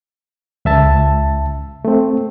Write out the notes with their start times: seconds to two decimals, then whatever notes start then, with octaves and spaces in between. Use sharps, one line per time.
0.65 C#2 E5 A5
1.85 A3 C4